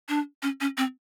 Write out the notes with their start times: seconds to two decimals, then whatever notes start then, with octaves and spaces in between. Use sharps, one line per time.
0.09 D4
0.42 C#4
0.60 C#4
0.77 C4